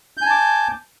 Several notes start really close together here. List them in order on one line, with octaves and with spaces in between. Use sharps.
G6 G#5 A5 D6